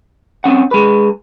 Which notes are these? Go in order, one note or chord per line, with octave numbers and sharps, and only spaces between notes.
C4 C#4 F#5
G#3 B4